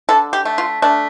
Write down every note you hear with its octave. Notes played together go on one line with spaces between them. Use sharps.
D3 A4
G4
A3
F4
A3 D4